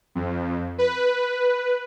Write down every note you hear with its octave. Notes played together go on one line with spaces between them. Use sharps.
F2
B4